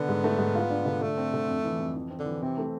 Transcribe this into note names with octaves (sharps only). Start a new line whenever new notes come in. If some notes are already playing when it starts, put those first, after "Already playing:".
Already playing: D3 B3
G#2
A3
G#2
F4
D4
D3
D3 A3
C4
D3
F2
E3
F2
E3
C4
D3
E3
C3 C4
A3